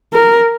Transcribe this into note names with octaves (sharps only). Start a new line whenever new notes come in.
A#4